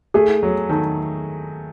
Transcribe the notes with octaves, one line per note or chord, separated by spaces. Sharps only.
A3 G#4
F#3
D#3 A4